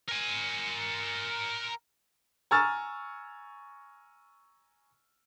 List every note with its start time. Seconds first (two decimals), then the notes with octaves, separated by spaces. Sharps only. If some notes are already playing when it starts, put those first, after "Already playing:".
0.09 A#4 G#5
2.51 G#5 A#5 C#6 E6 F6 A6